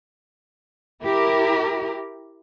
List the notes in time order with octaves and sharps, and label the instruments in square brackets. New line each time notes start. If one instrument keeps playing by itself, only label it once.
[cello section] E4 G4 A#4